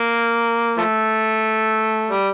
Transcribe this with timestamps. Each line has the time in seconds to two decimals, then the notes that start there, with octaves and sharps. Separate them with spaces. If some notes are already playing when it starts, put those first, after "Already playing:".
Already playing: A#3
0.77 F3 A3
2.11 G3